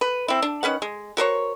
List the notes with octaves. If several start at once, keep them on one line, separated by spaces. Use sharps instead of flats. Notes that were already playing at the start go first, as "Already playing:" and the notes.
B4
C4 E4
D4
D#3 C#4 B4 F#5
G#3
F#4 A#4 C5 C#5